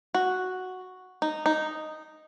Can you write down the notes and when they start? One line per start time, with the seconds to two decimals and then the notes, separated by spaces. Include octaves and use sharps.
0.15 F#4
1.22 D#4
1.46 D#4